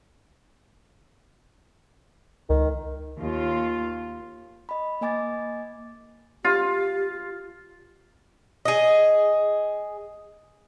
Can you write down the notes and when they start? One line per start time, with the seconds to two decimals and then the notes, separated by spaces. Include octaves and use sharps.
2.50 C#2 D#3
3.20 D#2 F4
4.69 D#5 B5
5.01 A#3 D#5 G#5 D6 A6
6.44 F4 G4
8.65 G#4 D#5